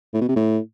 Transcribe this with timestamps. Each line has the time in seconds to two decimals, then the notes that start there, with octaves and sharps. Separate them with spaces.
0.14 A2
0.21 B2
0.29 C3
0.36 A2